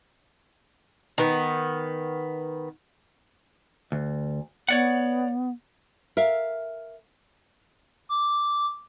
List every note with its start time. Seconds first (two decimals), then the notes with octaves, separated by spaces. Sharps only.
1.18 D#3 B3
3.92 D2
4.69 B3 C#5 D5 F#5
6.17 A#4 E5 F5
8.09 D6